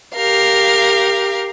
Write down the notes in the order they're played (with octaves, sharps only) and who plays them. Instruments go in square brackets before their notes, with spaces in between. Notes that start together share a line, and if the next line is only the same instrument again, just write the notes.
[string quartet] G4 A#4 F5